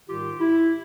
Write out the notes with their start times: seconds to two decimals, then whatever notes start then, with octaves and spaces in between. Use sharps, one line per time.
0.08 G#2 D#3 G3 F4 G4
0.39 E4